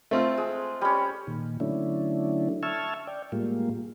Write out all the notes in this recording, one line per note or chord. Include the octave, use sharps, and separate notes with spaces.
A3 C4 F4
G#3
G3 C#4
A#2 D#3
D3 F#3 A3 C#4 D4 E4
E5 A5 C#6 E6 F6 G#6
D5 G5
A2 G3 G#3 A#3 F4